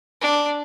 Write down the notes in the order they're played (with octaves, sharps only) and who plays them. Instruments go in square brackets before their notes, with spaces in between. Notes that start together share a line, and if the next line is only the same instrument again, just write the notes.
[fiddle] D4